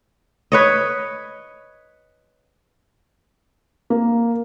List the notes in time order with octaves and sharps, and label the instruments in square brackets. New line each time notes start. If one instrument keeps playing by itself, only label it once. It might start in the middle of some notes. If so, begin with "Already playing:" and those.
[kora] B4 C#5 D#5
[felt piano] A#3